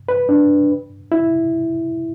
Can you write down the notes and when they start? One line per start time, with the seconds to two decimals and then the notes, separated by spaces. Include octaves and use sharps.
0.09 B4
0.29 D4
1.12 E4